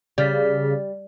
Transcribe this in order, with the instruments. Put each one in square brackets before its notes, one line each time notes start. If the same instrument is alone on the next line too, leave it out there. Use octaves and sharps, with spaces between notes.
[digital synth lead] C#3 [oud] G3 [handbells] D5 F6 B6